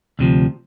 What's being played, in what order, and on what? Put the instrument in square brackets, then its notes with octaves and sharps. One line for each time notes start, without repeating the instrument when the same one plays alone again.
[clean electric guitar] D2 C3 F3